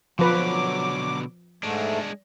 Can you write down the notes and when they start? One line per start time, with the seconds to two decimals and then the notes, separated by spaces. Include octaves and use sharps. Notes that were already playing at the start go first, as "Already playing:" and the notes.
0.19 B2 D3 F3 F#3 B4 D6
1.63 G#2 G#3 A3 D4